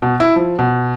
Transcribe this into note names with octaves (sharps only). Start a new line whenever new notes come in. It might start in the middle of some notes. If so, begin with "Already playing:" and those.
B2
E4
F3
B2